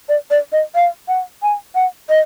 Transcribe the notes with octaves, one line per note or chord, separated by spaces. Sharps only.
D5
D5
D#5
F5
F#5
G#5
F#5
D#5